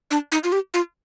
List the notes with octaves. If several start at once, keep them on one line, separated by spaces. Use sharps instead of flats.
D4
D#4
F4
G4
F4